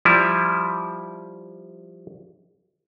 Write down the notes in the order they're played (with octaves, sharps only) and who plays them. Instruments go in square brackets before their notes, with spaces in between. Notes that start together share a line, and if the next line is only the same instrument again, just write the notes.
[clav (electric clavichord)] F3 G3 E4